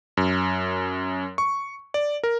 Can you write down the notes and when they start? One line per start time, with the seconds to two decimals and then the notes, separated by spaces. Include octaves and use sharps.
0.17 F#2
1.38 C#6
1.94 D5
2.23 A#4